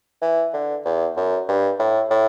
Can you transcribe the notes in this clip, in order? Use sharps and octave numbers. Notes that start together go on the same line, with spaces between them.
E3
D3
E2
F#2
G2
A2
A2